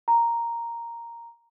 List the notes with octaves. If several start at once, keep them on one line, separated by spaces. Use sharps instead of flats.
A#5